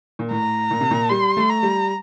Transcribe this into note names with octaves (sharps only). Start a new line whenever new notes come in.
A#2
A2 A#5
A#2
C3
A#2
G3 C6
A3
A#5
G3